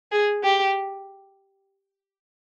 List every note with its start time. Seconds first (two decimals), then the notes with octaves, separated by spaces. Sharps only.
0.12 G#4
0.44 G4